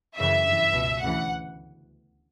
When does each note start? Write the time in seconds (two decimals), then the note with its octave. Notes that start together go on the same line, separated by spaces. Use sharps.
0.16 F#2 C#3 E3 E5
0.44 G2 E3
0.72 C#2 B2
1.00 D2 C#3 E3 F#5